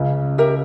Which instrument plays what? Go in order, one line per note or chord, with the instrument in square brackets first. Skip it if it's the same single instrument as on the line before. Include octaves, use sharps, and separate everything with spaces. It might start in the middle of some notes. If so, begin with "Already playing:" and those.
Already playing: [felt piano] C#2 C#3
[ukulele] G4 A#4 E5